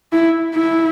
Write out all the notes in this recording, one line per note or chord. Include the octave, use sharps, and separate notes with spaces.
E4
E4